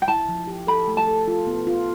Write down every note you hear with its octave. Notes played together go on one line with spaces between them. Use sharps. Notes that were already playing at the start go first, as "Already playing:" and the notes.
G5
E4 A5
F3
G4
A4 B5
A3
A5
A4
F4
B3
F4